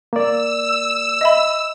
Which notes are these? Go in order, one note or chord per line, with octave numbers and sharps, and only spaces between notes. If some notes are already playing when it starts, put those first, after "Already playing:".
A#3 D5 E6
D#5 E5 B5